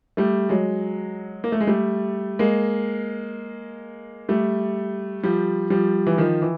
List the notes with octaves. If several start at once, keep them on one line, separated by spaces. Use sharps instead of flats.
G3 A3
F#3 G#3
A#3
A3
G#3
G3 A3
G#3 A#3
G3 A3
F3 G3
F3 G3
E3
D#3 F3
E3